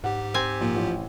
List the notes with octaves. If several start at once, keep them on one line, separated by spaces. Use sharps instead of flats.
G#2 G4 F#5
C4 G#5
A#2 F3
A1